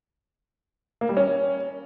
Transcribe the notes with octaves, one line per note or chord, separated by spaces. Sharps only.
A#3
G3
C#4